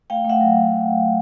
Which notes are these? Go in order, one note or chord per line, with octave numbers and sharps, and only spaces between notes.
A3 F5 G5
A3 E5 F#5
F#3